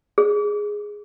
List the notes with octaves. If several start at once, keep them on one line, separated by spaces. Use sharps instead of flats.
G#4